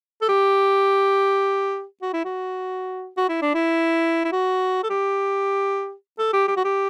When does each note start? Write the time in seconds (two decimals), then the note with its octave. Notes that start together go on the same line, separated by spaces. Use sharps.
0.22 A4
0.29 G4
2.02 F#4
2.13 E4
2.25 F#4
3.17 F#4
3.29 E4
3.42 D4
3.54 E4
4.25 E4
4.32 F#4
4.83 A4
4.90 G4
6.19 A4
6.33 G4
6.48 G4
6.57 F#4
6.65 G4